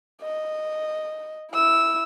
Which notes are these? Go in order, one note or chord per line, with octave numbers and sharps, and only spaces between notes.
D#5
E4 E6